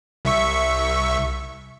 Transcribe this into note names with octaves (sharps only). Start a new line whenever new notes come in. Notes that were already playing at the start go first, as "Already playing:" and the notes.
C2 E5 C#6